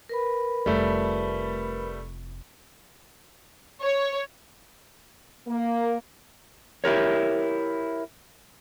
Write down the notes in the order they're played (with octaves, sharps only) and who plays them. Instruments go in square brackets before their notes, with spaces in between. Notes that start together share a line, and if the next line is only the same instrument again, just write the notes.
[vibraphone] A#4 B4 B5
[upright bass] F1 F4 [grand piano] G3 A3
[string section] C#5
[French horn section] A#3
[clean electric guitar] E4 G4 A#4 C#5